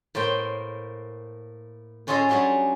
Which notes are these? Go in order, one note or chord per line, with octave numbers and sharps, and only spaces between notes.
A2 A#3 C5 G5
A2 C#4 F4 G#4 A4 D#5
F#3 G3 C#4 D4 G#4